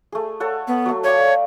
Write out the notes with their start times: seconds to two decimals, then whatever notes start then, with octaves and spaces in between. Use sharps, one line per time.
0.12 A3 G#4
0.40 A4 C#5 F#5
0.68 B3
0.85 F#3 A3
1.04 C#5 D5 F5 G5